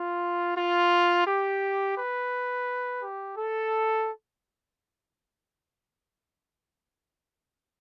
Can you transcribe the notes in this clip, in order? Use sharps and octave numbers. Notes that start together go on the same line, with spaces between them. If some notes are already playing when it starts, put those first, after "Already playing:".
Already playing: F4
F4
G4
B4
G4
A4